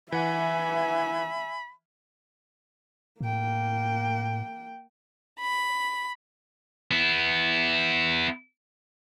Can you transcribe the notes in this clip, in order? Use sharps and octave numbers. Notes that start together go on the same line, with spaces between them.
E3 E5 F#5 G#5 B5
A2 A#3 G5
B5
B3 E4